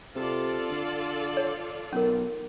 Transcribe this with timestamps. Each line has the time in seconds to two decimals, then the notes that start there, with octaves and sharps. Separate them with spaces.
0.15 C3 F4 A4 D5
0.69 D3
1.37 C#5
1.93 B1 C#4 A#4